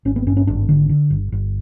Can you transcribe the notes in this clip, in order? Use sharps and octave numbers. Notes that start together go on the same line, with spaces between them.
G#1 C#4
B3
G2 C#4
C#4
G#1 D4
D3
D3
G1
G1